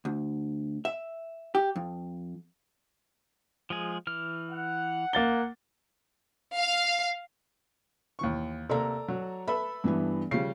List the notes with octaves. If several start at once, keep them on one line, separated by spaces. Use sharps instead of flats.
D2
E5
G4
F2
F3 G#3 G#4
E3 F6
F#5
A#3 A6 G7
F5
D#2 E3 C#6
C3 A#3 A4 D5 A#5
F#3
A4 B4 E5 B5
G2 E3 B3
C#3 F3 G3 C7